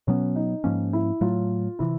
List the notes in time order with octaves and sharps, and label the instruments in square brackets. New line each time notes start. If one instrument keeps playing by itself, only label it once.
[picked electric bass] B2 F#3 B3 [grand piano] C#4
[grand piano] D#4
[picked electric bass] G#2 F3 A#3 C#4
[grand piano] E4
[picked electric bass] A2 F#3 A3 [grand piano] F4
[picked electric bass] C3 E3 [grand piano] E4